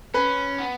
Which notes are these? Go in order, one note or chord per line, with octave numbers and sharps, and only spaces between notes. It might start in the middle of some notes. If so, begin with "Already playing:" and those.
C#4 B4
B3